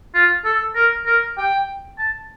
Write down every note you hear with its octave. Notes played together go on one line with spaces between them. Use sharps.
F4
A4
A#4
A#4
G5
A5